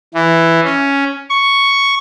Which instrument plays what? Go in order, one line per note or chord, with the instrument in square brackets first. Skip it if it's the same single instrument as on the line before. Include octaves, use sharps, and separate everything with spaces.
[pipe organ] E3
C#4
C#6